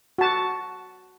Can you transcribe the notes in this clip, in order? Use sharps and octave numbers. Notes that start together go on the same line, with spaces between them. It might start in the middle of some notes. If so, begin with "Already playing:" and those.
F#4 A5